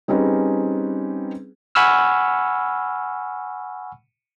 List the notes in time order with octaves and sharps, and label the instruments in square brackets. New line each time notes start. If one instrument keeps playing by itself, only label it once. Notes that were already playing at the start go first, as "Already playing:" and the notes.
[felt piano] G3 C4 C#4 D#4 G#4 B4
[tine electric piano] F#5 G#5 B5 C#6 E6 F6